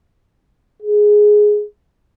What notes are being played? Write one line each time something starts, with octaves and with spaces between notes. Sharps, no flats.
G#4